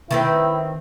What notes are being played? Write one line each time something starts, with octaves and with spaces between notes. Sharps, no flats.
D#3 C4 E4 B4